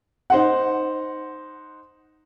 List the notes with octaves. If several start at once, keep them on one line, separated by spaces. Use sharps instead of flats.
D#4 C5 F#5